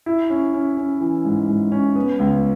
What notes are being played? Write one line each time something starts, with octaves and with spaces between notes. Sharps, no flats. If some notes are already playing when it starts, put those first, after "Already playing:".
E4
C#4
C#4
C#4
E3
G#2
G#2
C#4
B3
C#2